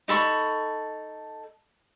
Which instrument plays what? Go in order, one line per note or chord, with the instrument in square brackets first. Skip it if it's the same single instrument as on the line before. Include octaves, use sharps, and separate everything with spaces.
[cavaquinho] D#4 A4 B5 C#6